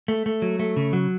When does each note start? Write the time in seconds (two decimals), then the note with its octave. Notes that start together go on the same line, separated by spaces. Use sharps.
0.08 A3
0.26 A3
0.42 F#3
0.59 A3
0.76 C#3
0.93 F#3